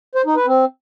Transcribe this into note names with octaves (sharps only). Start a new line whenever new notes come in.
C5
D#4
B4
C4